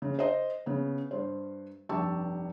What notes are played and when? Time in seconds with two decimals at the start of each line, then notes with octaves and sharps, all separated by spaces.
0.02 C#3
0.19 C5 D#5
0.66 C#3 B3
1.11 G2 C5
1.89 F1 G2 G4 A5 C#6 E6